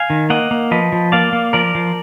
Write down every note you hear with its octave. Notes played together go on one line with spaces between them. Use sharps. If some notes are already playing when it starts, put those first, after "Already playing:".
Already playing: F5 G#5
D#3
A#3 D#5 F#5
A#3
F3 B4 D#5
F3
A#3 D5 F5
A#3
F3 A#4 D5
F3